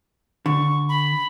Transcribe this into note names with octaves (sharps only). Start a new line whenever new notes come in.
D3 C#6
B5